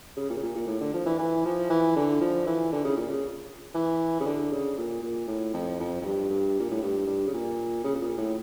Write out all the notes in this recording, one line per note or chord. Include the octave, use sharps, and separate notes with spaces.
C#3
A#2
C#3
A#2
A#2
A2
D3
F3
E3
E3
F3
E3
D3
F3
E3
D3
C#3
A#2
C#3
E3
C#3
D3
C#3
A#2
A#2
A2
F2
F2
F2
G2
G2
A#2
A2
G2
G2
C#3
A#2
C#3
C#3
A#2
A2